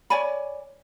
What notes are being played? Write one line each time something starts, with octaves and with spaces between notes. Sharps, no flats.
C#5 D5 G#5 B5